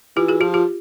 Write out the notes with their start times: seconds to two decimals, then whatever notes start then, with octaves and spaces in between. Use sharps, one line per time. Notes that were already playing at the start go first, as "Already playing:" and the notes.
0.16 E3 F4 G4
0.28 F#4 G#4
0.41 F3 F4 G4
0.54 F4 G4